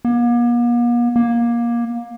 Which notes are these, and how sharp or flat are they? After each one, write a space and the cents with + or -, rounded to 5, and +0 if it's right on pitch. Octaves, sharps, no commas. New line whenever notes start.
A#3 +45
A#3 +20